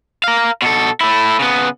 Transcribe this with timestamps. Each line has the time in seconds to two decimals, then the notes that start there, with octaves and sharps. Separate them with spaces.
0.24 A#4 F5
0.62 B2 A4
1.01 A3 E4
1.39 C#3 B3